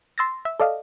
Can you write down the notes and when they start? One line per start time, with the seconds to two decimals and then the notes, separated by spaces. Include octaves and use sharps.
0.18 C6 E6 A6 A#6
0.45 E5
0.60 A4 D5 D#5 F5